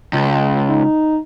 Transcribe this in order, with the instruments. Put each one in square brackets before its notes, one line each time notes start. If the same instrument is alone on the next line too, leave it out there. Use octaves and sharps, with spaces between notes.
[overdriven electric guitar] C#2
[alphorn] D#4